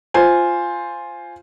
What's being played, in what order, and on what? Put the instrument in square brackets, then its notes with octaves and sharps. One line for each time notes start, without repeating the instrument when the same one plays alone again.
[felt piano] F4 C5 G#5